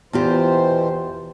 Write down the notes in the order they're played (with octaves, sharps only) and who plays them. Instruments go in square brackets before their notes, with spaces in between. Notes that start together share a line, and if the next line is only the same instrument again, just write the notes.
[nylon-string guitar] E2 F4 G4 [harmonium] B2 E3 C5